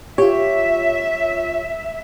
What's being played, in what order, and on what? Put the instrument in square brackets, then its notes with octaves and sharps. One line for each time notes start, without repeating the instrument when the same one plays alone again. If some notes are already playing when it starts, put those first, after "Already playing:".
[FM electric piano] F4 C#5 [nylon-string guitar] G4 [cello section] E5